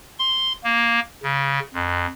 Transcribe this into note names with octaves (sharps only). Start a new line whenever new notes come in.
C6
A#3
C#3
F2